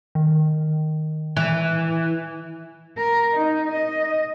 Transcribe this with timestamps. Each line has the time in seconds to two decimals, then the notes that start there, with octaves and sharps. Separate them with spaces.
0.15 D#3
1.37 E3
2.97 A#4
3.34 D#4
3.71 D#5